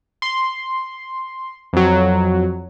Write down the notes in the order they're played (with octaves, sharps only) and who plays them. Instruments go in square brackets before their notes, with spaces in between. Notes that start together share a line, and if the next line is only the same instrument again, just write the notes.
[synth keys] C6
F2 F#3